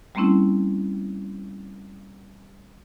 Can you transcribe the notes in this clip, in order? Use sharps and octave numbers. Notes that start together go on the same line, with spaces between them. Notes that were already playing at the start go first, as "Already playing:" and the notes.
G3 A3 A#3 C4 C#4 E4